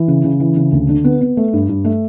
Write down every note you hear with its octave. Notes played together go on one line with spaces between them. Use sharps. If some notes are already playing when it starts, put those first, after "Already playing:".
Already playing: E3
C#3
C#3
E3
C#3
D2
D3
B3
B3
A3
G2
G2
A3